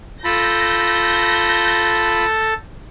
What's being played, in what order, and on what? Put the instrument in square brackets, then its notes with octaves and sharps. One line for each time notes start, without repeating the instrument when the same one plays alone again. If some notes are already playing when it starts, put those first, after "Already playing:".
[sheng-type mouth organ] F4 B5 [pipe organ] A4 [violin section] G6 A#6